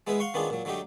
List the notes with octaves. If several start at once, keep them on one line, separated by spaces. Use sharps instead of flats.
G#3 B3 E4 G#4 B4
F5 F#5 C6 C#6
D#3 B3 C#4 D4 F4 G#4
A#2 F#3
D3 F#3 A3 D#4 G4